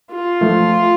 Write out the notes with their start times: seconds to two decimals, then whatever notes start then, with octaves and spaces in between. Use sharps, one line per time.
0.11 F4
0.41 F3 A3